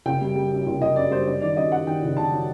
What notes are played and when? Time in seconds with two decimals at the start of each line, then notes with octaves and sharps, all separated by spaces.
0.06 F#1 G5
0.21 G3
0.35 G3
0.50 F#2
0.67 F#1
0.81 F#1 D#5
0.96 F#2 D5
1.11 G3 C5
1.26 F#2 D5
1.42 D#3 D5
1.57 F#2 D#5
1.71 F#2 F#5
1.87 D#3 G5
2.03 F#1
2.16 F#1 A5
2.32 F#3